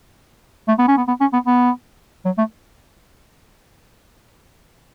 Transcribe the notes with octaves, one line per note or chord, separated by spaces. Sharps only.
A3
B3
C#4
B3
B3
C#4
B3
B3
F#3
A3